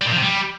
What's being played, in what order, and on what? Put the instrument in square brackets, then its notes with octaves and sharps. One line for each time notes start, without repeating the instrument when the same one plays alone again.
[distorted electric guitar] G3
A#2
F3
C3
G3